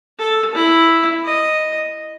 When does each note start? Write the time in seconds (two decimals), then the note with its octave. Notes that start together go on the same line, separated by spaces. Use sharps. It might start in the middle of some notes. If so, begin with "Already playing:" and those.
0.19 A4
0.55 E4
1.25 D#5